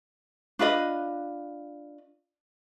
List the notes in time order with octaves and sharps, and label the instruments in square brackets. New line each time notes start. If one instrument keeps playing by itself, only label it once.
[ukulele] D4 F4 B4 D#5